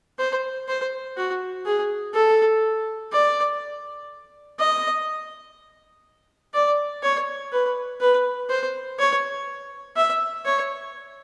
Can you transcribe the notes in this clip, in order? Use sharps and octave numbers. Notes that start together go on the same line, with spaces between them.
C5
C5
F#4
G#4
A4
D5
D#5
D5
C#5
B4
B4
C5
C#5
E5
C#5